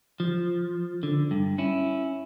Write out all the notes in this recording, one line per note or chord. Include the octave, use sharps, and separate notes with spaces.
F3
D3
G2
C#4 E4